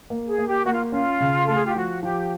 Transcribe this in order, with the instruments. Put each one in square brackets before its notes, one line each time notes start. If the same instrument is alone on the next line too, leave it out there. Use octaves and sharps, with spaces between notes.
[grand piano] A#3
[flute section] G#4
[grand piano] A#3
[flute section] G4
[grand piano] A#3 [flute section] F#4
[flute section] F4
[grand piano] C#4 [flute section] F4
[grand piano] C#3
[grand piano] A3 [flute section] A4
[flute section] G#4
G4
[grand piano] F3 [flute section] F#4
[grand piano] F3 [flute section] G4